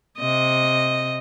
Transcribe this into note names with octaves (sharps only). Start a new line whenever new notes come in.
C3 D#5